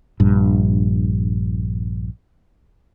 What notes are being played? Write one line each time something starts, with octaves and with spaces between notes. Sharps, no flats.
A#1 G2